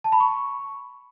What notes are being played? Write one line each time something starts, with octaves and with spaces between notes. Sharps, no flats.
A5
B5
C#6